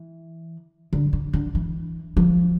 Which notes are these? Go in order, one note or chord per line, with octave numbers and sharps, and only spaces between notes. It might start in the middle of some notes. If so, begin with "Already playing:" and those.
Already playing: E3
D3
C#3
D3
E3
F3